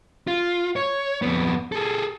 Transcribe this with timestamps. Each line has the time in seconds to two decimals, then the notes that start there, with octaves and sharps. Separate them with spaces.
0.28 F4
0.76 C#5
1.22 F2 B3
1.72 G#4 A4